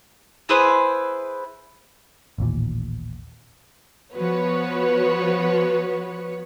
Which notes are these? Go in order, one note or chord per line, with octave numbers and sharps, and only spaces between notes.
E4 G#4 B4 C5
A1 D#2 A#2
F3 B3 F#4 B4 C#5